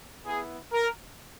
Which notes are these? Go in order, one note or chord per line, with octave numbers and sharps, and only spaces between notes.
B3 E4 G#4
A#4